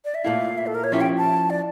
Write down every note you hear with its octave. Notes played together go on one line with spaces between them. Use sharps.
D5
E5
A#2 A3 E4 F5
E5
A4
A#4
C#5
F3 C#4 E4 G4 E5
G5
A5
D5